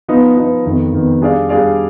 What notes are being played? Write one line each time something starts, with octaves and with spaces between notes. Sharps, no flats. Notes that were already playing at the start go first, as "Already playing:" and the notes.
F3 B3 D#4
F3 B3 D#4
F2 D#3 B3
F2 D#3 B3
G3 D4 G#4 D5 F5
G3 D4 G#4 D5 F5